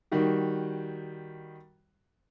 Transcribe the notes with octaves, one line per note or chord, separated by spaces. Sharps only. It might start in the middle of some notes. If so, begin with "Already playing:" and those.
D#3 G3 F#4